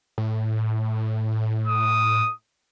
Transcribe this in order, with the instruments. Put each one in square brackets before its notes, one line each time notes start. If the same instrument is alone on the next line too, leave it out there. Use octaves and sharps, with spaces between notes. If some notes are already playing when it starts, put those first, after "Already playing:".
[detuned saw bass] A2
[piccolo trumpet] D#6